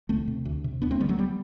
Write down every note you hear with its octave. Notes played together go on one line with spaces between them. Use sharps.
D2 A3 C4
C3
D2
C3
D2 B3 D4
A3 C4
D3 G3 B3
F#3 A3
G3 B3